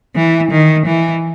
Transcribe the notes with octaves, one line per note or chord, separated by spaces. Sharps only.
E3
D#3
E3